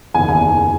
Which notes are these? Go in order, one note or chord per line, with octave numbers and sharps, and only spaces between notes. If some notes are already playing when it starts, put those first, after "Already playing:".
F#1 E2 D#3 G#5
G#5